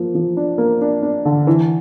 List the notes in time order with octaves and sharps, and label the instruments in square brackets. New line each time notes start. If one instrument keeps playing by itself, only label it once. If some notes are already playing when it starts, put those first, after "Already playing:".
Already playing: [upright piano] F3 A#3
F3
D4
A#3
D4
D4
D3
E3